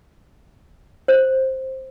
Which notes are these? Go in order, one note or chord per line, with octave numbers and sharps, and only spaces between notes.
C5